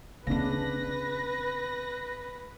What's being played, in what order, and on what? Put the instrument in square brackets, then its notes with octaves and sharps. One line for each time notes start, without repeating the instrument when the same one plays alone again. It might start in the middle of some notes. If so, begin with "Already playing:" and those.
[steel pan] C#3 D4 [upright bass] B3 C4 [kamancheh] B4 [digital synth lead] A#6